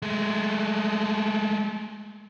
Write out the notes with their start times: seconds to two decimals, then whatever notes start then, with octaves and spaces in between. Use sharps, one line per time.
0.02 G#3 A3